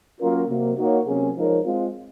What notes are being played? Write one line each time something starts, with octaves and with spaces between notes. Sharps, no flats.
F#3 A#3 C#4 F4 A#4
C3 F#3 A#3
A#3 D#4 F#4 C#5
C3 F#3 A#3 C#4 G#4
F3 G#3 D#4 A#4 C#5
G#3 C4 F4